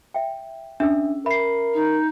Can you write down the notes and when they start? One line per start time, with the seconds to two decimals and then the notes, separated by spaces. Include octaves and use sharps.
0.14 E5 G5
0.80 C#4 D4 G#4 E5 E6
1.26 A#4 E5 B5 C7
1.74 D#4